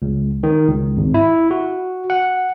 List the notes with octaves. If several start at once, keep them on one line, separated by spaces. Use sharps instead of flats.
C#2
D#3
C#2
G#1
E4
F#4
F#5